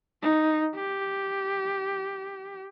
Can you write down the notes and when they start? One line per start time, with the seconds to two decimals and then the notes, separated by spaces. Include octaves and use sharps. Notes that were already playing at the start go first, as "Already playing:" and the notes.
0.22 D#4
0.75 G4